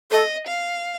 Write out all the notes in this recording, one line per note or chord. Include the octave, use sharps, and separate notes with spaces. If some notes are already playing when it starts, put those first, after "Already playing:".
A4 D#5
F5